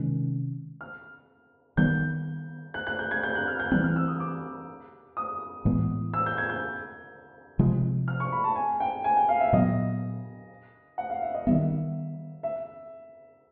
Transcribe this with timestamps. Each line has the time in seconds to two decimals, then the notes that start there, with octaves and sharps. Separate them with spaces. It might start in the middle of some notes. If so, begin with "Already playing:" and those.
Already playing: C3 D#3 G#3 C#4
0.81 F6
1.77 D#3 G3 B3 G6
2.74 F#6
2.87 F#6
2.99 G6
3.11 G#6
3.23 G6
3.35 F#6
3.48 F6
3.59 G6
3.71 E3 G3 C4 F#6
3.84 F6
3.96 E6
4.08 D#6
4.20 D6
5.17 D#6
5.65 A2 E3 G#3 B3
6.14 E6
6.26 G6
6.38 G#6
6.50 G6
7.59 C3 F3 G#3
8.08 F6
8.20 C#6
8.32 B5
8.44 A5
8.56 G#5
8.80 G5
9.04 G#5
9.17 G5
9.29 F5
9.40 E5
9.53 A#2 F#3 B3 D#5
10.98 F#5
11.10 F5
11.22 E5
11.34 D#5
11.46 D#3 G3 B3 E5
12.43 E5